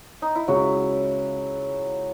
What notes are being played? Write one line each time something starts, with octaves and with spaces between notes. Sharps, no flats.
D#4
E4
C#2 C#3 F#3 G#3 C#4 F#4